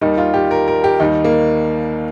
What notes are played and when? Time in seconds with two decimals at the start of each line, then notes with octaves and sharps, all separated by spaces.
0.01 D#2 D#3 G3 D#4
0.18 F4
0.34 G4
0.51 A#4
0.68 A#4
0.84 G4
1.00 D#2 D#3 G3 D#4
1.24 A#3